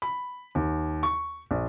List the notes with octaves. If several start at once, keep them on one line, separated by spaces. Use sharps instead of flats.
B5
D#2
C#6
A#1